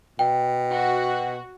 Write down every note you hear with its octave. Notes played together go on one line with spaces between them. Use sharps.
B2 G5
F#4